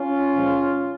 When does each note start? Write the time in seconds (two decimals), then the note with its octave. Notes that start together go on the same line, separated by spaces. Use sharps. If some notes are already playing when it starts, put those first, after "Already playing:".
Already playing: C#4 F4
0.35 A#2 F3 G#3